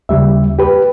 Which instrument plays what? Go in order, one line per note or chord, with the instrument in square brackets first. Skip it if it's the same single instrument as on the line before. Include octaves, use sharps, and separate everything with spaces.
[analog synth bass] D#2 [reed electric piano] C#3 G3 E5
[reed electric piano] G4 B4